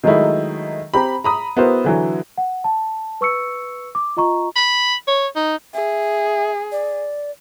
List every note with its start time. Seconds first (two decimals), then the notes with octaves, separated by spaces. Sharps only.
0.04 D#3 F#3 G#3 A3 D#4 E4
0.94 C4 G4 A#5 B5
1.24 A#5 B5 D#6
1.57 B3 E4 F#4 A#4 C5
1.84 D3 E3 F#3
2.38 F#5
2.64 A5
3.21 B4 C#6 E6 C#7
3.95 D6
4.17 F4 D#5 A#5 C#6
4.56 B5
5.08 C#5
5.36 D#4
5.74 G#4 E5
6.72 D5